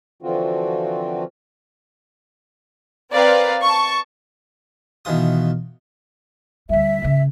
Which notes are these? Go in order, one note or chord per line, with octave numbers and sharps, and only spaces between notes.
D3 E3 F3 C4 F4 F#4
C4 A#4 B4 D5 F5
A5 C#6
B2 D#3 E3 F4 D#6
D2 G3 E5
G#2 C#3